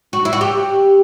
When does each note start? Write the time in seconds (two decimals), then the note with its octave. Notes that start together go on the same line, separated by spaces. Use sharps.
0.13 F#4
0.25 E4
0.33 F#4
0.41 G4